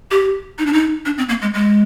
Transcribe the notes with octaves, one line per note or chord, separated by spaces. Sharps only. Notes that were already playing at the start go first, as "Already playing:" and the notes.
G4
D#4
D4
D#4
D4
C4
A#3
G#3
G#3